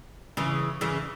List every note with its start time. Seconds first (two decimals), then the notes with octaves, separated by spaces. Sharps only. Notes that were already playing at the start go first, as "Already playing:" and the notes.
0.37 C#3 E3
0.81 C#3 E3